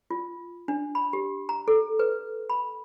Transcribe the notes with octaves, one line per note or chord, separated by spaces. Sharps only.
F4
D4
B5
G4
A#5
A4
B4
B5